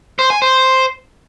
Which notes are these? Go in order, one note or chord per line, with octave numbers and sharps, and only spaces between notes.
C5
G#5
C5